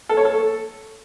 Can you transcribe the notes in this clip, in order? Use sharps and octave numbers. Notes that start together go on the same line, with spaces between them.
A4
C#5
A4